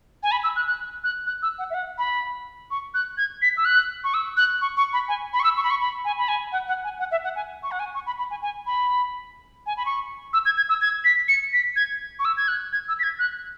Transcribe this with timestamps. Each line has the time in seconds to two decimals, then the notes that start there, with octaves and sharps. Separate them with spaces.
0.23 G#5
0.32 B5
0.44 E6
0.56 F#6
0.68 F#6
1.04 F#6
1.27 F#6
1.42 E6
1.59 F#5
1.70 E5
1.74 F#5
1.98 B5
2.71 C#6
2.94 F#6
3.17 G#6
3.42 B6
3.57 E6
3.65 F#6
4.04 C#6
4.14 E6
4.37 F#6
4.61 C#6
4.77 C#6
4.93 B5
5.08 G#5
5.33 B5
5.40 C#6
5.44 E6
5.57 C#6
5.63 B5
5.70 C#6
5.81 B5
6.05 G#5
6.18 B5
6.28 G#5
6.52 F#5
6.68 F#5
6.84 G#5
6.99 F#5
7.11 E5
7.24 F#5
7.36 G#5
7.63 C#6
7.71 F#5
7.80 G#5
7.94 C#6
8.06 B5
8.19 B5
8.31 G#5
8.42 G#5
8.66 B5
9.66 G#5
9.77 B5
9.85 C#6
10.33 E6
10.46 G#6
10.57 G#6
10.69 E6
10.81 G#6
11.05 B6
11.28 C#7
11.53 B6
11.76 G#6
12.19 C#6
12.25 E6
12.37 G#6
12.48 F#6
12.73 G#6
12.88 E6
12.99 B6
13.03 G#6
13.19 F#6